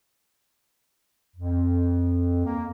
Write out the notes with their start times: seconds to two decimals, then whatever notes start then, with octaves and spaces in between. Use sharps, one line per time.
1.36 F2
2.45 A#3